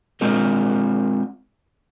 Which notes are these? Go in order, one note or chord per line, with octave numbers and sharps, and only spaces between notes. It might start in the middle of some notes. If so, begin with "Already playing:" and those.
G#3 C4 F4 A#4